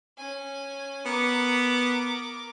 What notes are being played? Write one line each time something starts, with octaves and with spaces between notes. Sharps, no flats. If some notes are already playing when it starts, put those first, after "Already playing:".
C#4 G#5
B3 A#4 D6